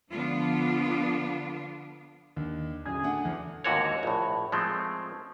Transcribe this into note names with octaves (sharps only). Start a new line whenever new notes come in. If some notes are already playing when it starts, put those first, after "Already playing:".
D3 F3 B3 D4 F4
D#2 D4
D1 C#3 G#4
A3 D4 F#5
E2
D#2 G#2 D3 F#4 A#4 C#5
A#1 A2
F3 G#3 A3 C4